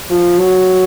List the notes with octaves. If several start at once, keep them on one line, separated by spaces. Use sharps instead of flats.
F3
F#3